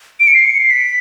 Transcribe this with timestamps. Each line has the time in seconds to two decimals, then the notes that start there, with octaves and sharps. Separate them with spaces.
0.20 D7
0.27 C#7
0.34 C7
0.46 C#7
0.58 C7
0.70 B6